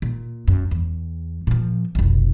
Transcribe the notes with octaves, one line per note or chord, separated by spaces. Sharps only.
A#2
F#2
E2
A#2 F3
F1 B1